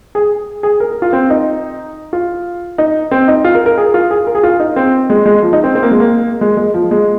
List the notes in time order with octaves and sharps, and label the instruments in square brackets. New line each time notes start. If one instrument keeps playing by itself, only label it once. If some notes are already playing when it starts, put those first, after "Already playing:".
[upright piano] G#4
G#4
A#4
A#4
F4
C4
D#4
F4
D#4
C4
D#4
F4
A#4
A#4
G#4
F4
G#4
A#4
G#4
F4
D#4
C4
G#3
G#3
F3
D#4
C4
C4
A#3
G#3
A#3
G#3
G#3
F3
G#3